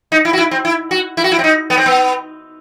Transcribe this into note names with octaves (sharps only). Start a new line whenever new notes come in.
D#4
E4
F#4
E4
C4
E4
F#4
E4
F#4
E4
C4
D#4
B3
C4
B3